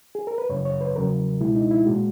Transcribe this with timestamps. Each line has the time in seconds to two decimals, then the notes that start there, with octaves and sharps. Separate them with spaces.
0.15 G#4
0.27 A#4
0.38 B4
0.49 F#2 C#3 F#3 C#5
0.65 C#5
0.81 B4
0.95 E2 C#3 F#3 A#4
1.40 C#2 B2 G#3 E4
1.55 D#4
1.71 E4
1.86 A#2 G#3 F#4